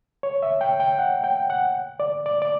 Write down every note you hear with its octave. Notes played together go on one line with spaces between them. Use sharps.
C#5
E5
G5
G5
F#5
G5
F#5
D5
D5
D5